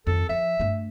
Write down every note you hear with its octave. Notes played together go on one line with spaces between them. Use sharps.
F2 D#3 A4
F3 E5
G2 A3